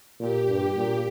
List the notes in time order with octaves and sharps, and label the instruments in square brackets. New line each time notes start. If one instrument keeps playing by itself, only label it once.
[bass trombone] A#2 [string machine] G4
[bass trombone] G2 [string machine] G4
[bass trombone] A#2